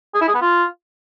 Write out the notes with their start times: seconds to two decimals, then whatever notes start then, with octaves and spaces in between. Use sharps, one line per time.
0.14 G#4
0.21 E4
0.28 G#4
0.35 B3
0.41 F4